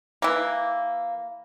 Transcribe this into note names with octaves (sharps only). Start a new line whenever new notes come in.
E3 A#3